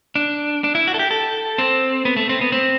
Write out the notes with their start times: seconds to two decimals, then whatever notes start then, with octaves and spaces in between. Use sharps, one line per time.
0.15 D4
0.64 D4
0.75 E4
0.88 F#4
0.94 A4
0.99 G4
1.11 A4
1.58 C4
2.05 B3
2.16 A3
2.29 C4
2.41 B3
2.52 C4